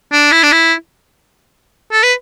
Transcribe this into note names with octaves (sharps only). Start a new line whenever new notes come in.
D4
E4
D4
E4
A4
B4